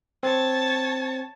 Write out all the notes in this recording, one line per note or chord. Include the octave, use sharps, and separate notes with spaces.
C4 C#5 A5